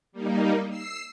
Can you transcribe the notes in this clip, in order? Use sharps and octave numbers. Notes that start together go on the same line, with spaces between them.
G3 A#3 D#4
E6 C7